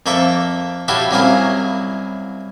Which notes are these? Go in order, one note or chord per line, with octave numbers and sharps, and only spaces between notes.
F2 A#3 A4 E5 C#6 D6
E4 F#4 G4 A4 C#5 F5
C2 F#3 A#3 C#4 E4 F5